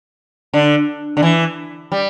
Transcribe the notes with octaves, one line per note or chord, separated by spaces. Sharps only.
D3
D3
E3
G3